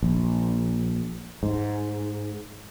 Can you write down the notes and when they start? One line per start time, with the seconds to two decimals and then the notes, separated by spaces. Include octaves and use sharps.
0.03 A#1
1.43 G#2